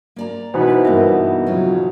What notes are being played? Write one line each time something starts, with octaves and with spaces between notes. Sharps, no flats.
A#3 D5 A#5
B2 E3 D#4 B4 C5
G2 A#3 B3 E5
F2 C#3 F#3 F4 C#5